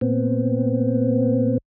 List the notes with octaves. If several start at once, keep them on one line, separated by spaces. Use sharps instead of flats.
A#2 B3 C4